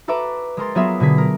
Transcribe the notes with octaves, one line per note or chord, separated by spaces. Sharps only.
F#4 A4 B4 E5 A#5 D6
G#3 A#4 C6 A6
F#3 B3 F4 G#4 A#4 E5
B2 D3 G#4 B6
A#4